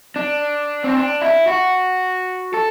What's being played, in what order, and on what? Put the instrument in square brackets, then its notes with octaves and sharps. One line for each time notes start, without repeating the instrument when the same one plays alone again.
[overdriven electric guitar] D4
C4
D4
E4
F#4
A4